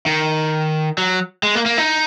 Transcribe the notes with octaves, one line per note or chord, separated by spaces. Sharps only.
D#3
F#3
G#3
A#3
A#3
D#4